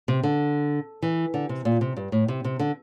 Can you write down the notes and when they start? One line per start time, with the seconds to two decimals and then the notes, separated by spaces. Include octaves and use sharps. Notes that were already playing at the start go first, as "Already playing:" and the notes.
0.08 C3
0.23 D3
1.02 E3
1.34 D3
1.49 C3
1.65 A#2
1.81 C3
1.96 G2
2.12 A2
2.28 C3
2.44 C3
2.59 D3